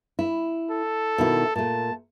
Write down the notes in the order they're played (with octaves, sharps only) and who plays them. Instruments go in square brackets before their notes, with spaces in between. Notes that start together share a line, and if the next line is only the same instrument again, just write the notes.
[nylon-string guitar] E4
[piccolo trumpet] A4
[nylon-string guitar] B2 D#3 E4
[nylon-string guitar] A#2 A3 [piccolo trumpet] A5